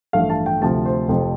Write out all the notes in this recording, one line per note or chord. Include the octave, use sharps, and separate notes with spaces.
A1 G2 F3 A3 F5
A5
G5
D2 C3 F3 A5
C5
F1 F2 F3